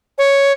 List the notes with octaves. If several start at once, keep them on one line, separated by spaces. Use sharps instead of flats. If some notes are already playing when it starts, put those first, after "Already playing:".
C#5